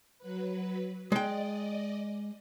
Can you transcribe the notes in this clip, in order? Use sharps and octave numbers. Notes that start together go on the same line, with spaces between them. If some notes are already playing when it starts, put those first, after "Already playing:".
F#3 B4
G#3 D5 D#5 G5